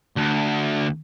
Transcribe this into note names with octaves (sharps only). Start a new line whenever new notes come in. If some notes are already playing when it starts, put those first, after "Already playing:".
D2